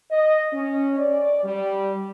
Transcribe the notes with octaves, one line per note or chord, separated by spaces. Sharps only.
D#5
C#4
D5
G3